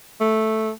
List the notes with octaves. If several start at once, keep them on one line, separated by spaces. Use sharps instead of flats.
A3